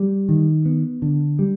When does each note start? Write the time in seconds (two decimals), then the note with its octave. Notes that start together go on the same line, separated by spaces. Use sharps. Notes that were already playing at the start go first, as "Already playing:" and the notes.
Already playing: G3
0.29 D#3
0.65 B3
1.02 D3
1.39 G3